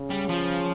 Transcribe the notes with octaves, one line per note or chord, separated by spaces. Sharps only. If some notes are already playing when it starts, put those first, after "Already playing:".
Already playing: C#3
G3
F3